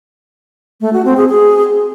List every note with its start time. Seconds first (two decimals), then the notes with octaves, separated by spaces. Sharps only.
0.81 A3
0.93 F#4
1.05 C4
1.17 G#4
1.29 G#4